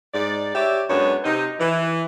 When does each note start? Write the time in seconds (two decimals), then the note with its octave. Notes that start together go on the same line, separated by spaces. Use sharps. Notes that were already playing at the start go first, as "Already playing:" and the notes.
0.14 G#2 D5
0.55 G4 C#5 D5 E5
0.90 F#2 G#3 B3 D4 C#5
1.24 C3 C4 D#4
1.60 E3